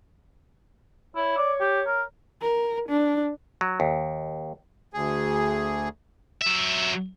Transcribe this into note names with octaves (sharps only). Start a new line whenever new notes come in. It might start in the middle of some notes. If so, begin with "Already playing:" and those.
E4 C#5
D5
G4
A#4
A#4
D4
F#3
D#2
D2 G#4
F#3 E5